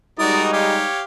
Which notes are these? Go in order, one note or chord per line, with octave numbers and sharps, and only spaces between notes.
G3 G#3 D#4 F#4 A#4 D5 D#6
G4 C#5 F5